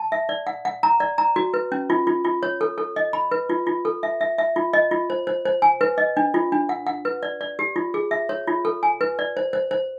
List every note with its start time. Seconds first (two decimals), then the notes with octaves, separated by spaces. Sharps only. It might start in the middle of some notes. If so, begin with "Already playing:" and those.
Already playing: A5
0.12 E5
0.29 D5
0.47 F#5
0.65 F#5
0.83 A#5
1.00 D5
1.18 A#5
1.36 F#4
1.54 B4
1.72 C#4
1.90 F4
2.07 F4
2.24 F4
2.43 C#5
2.61 A4
2.78 A4
2.96 D#5
3.13 B5
3.31 B4
3.50 F4
3.67 F4
3.85 A4
4.03 E5
4.21 E5
4.38 E5
4.56 F4
4.73 D#5
4.91 F4
5.10 C5
5.27 C5
5.46 C5
5.62 G#5
5.81 B4
5.98 D#5
6.17 D4
6.34 F4
6.52 D4
6.69 F#5
6.87 F#5
7.05 B4
7.23 D5
7.41 D5
7.59 G4
7.76 F4
7.94 G#4
8.11 E5
8.29 C#5
8.47 F4
8.65 A4
8.83 G#5
9.01 B4
9.19 D5
9.37 C5
9.53 C5
9.71 C5